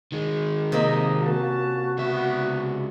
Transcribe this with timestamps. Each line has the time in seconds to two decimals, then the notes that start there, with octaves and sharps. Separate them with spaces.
0.12 D#3 G#3
0.72 C3 A#3 D#5
1.19 C#4 F4 F#4 A5
1.99 C#2 B3 E5